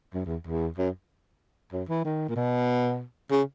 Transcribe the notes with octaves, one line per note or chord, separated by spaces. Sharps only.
F#2
E2
E2
F#2
F#2
E3
D#3
A#2
B2
C#3